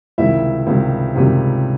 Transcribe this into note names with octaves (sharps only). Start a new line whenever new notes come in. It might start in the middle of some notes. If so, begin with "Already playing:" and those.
C#2 C3 D#3 G3 E4 E5
C#2 C3 D#3 G3
C#2 C3 D#3 G3